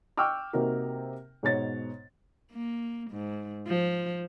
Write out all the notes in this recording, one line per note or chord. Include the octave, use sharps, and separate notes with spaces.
G5 C#6 D6 E6 F6
C3 A#3 D#4 F#4 A#4
G#2 B2 C#5 A6
A#3
G#2
F3